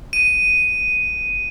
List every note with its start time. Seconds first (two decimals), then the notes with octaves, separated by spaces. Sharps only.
0.13 D#7